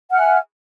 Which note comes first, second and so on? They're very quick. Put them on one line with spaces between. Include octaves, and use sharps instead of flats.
F#5 F6 E5 G#5